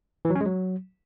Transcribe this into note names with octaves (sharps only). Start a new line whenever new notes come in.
E3
F#3
C#4
G#3
F#3